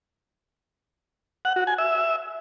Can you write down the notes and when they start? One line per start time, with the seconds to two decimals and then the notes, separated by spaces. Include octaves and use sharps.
1.45 F#5
1.56 F#4
1.67 G#5
1.78 E5